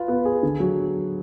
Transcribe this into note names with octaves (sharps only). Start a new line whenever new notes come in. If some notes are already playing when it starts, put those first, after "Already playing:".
Already playing: F4 B4
B3
G#4
D3
F#3